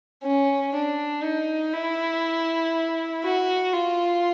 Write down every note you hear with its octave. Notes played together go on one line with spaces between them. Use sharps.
C#4
D4
D#4
E4
F#4
F4